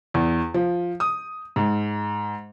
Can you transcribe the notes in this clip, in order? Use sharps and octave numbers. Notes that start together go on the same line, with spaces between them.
E2
F3
D#6
G#2